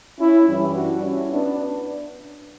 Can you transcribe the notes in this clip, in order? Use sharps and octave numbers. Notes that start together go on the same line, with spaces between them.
C#4 E4
G2 E3 G3 C#4 E4
D4 F#4
C#4 E4
B3 D4